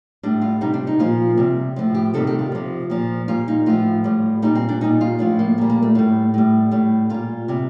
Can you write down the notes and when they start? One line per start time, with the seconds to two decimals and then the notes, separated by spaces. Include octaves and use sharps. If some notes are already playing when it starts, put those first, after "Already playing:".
0.23 A2 G3 D4
0.41 F4
0.61 C3 G3 D#4
0.74 D4
0.87 D#4
0.99 A#2 F3 F4
1.37 C3 G3
1.76 A2 F3
1.95 G4
2.14 C3 D#3 G3 A4
2.27 G4
2.39 F4
2.52 C3 F3
2.90 A#2 F3
3.28 A#2 G3 F4
3.48 D#4
3.66 A2 F3 F4
4.04 A2 G3
4.42 A#2 G3 D#4
4.55 C4
4.69 D4
4.81 A#2 G3 D#4
5.01 F4
5.19 A2 F3 D4
5.39 A#3
5.58 A#2 G3
5.70 A#3
5.82 A3
5.95 A2 G3
6.34 A2 G3
6.71 A2 G3
7.10 A#2 G3 F4
7.48 C3 G3